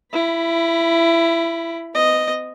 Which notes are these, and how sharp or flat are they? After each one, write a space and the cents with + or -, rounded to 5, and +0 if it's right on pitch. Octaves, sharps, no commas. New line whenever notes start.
E4 +20 B5 +0
C4 -45 D#5 -5